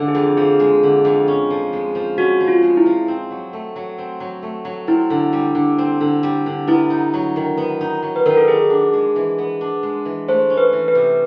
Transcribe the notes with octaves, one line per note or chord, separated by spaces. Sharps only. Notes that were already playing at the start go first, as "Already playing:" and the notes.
Already playing: D3 F3 G#3
G#4
F2
F3 G#4
G#3
D3
F2
C#4
F3
G#3
F3
C#4 F#4
F3
F4
G#3
E4
F3
C4
F#3
A3
F#3
C4
F#3
A3
F#3
C4 E4
D3
G3
D3
C4
D3
G3
D3
B3 E4
D#4
F#3
D#3
B3
D#4
F#3
B4
D#3 A#4
A4
B3 G#4
D4
G#3
E3
B3
D4
G#3
E3
A3 C5
C#4
B4
E3
B4
C3